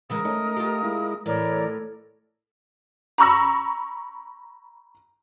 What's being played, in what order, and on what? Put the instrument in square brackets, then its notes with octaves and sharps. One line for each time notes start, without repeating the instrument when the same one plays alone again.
[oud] C#3 E3 G#3 [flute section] A#4 D#6
[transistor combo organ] A3 D#4 [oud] C#4
[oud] F4 G4
[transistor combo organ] G#3 E4
[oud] A2 [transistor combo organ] E3 [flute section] A#4 C#5 D5
[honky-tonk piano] A#5 B5 C#6 E6 A#6